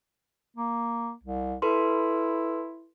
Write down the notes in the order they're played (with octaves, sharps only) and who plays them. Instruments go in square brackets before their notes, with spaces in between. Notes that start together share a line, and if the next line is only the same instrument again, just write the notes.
[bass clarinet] A#3
C2
[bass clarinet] E4 [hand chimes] A4 B4 C6